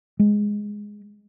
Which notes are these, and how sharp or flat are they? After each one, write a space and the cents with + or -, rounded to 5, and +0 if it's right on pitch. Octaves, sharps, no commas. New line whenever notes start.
G#3 +0